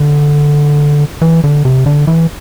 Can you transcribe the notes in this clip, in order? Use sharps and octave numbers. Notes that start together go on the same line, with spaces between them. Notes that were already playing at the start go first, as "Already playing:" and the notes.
Already playing: D3
E3
D3
C3
D3
E3